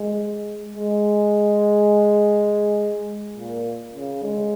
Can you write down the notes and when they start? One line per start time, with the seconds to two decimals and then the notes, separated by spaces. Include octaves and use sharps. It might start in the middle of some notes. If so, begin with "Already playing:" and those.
Already playing: G#3
0.77 G#3
3.37 A#2
3.94 C#3
4.23 G#3